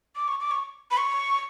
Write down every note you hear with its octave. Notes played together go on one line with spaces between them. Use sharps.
D6
C#6
D6
C#6
B5
C#6